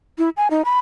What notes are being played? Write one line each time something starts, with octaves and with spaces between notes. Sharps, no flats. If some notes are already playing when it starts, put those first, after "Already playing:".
E4
G#5
D#4
B5